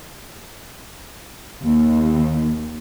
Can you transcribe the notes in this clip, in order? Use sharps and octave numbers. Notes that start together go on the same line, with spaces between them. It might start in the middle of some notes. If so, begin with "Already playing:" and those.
D#2